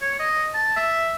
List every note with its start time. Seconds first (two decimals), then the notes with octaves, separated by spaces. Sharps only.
0.01 C#5
0.20 D#5
0.54 A5
0.76 E5